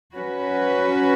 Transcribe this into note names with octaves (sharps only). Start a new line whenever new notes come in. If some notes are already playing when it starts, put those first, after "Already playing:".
F#3 C#4 F#4 B4